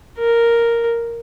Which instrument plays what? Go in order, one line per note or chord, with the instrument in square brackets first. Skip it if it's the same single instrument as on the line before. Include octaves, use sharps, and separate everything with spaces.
[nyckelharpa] A#4